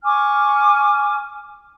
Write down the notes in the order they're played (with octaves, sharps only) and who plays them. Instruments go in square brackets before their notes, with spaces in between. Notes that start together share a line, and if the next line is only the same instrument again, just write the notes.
[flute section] G#5 C#6 D6 F6